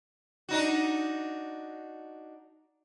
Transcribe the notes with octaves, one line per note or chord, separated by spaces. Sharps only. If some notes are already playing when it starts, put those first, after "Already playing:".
D4 D#4 F#4